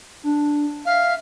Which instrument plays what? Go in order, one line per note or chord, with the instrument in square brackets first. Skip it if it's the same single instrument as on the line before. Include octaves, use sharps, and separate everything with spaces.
[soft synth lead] D4
[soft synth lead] E5 [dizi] F5